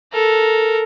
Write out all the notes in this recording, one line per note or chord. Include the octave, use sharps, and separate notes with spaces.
A4 A#4